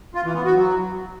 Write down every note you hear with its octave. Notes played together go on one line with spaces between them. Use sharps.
F4
E3
B3
F#4
F#3